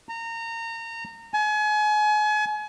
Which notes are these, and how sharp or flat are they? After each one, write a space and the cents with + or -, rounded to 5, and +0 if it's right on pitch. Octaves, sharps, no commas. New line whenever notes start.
A#5 -25
G#5 +35